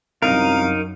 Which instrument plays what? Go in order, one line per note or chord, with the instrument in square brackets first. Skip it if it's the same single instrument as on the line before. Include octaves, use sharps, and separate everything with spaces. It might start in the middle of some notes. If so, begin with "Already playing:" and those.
[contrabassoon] C2 [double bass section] F#2 [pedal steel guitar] D#4 A#4 [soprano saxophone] F5